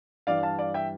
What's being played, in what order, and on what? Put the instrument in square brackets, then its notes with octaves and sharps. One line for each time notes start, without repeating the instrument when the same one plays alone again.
[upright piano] G2 E3 G3 D5 F5
F5 A5
D5 F5
E5 G5